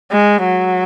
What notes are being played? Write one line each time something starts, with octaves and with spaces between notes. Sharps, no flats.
G#3
F#3